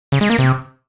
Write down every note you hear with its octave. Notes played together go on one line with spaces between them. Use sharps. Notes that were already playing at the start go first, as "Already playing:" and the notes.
C#3
G#3
A#3
C3